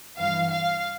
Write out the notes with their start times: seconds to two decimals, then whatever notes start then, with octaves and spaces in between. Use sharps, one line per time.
0.17 G2 E3 F5
0.50 F5